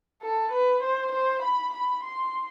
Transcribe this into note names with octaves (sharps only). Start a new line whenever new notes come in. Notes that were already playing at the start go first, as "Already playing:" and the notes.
A4
B4
C5
C5
B5
B5
C6